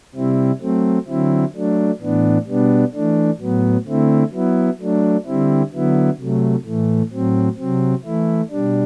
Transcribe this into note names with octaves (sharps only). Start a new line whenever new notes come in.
C3 G3 C4 E4
F#3 A3 C4
D3 F#3 C4 E4
F#3 A3 D4
A2 E3 B3 D4
B2 G3 B3 D4
E3 A3 D4
A2 F#3 B3
D3 A3 C4 E4
F#3 B3 E4
F#3 A3 D4
D3 G3 C4 E4
D3 F#3 B3 E4
C3 F#3 A3
A2 E3 A3
A2 F#3 C4
C3 F#3 C4
E3 A3 E4
B2 G3 D4